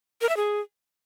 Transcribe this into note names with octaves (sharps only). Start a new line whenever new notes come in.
A#4
E5
G#4